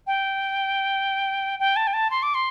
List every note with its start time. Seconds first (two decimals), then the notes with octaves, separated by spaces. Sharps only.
0.07 G5
1.60 G5
1.76 A5
1.87 G5
1.93 A5
2.10 C6
2.23 D6
2.34 C6